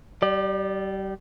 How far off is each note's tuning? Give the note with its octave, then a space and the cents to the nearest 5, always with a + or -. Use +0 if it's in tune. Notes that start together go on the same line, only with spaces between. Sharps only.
G3 -25 D5 +30